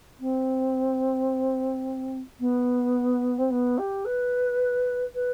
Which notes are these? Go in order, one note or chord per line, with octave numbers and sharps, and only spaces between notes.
C4
B3
C4
B3
G4
B4
B4